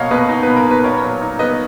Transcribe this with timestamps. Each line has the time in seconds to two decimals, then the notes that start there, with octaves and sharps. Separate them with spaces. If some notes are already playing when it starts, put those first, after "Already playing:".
Already playing: B2 A#3 C#5 D#5 F5 F#5
0.11 B2 B4 D#5
0.29 D#4
0.43 B2 B4
0.56 A#4
0.66 A#3 B4
0.84 A#2 A#4 C#5
1.03 F#3
1.21 D#4
1.39 B3 B4 D#5